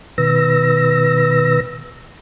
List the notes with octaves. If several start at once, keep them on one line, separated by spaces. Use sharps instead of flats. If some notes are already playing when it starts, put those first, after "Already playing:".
B2 D#3 B4 E6 A#6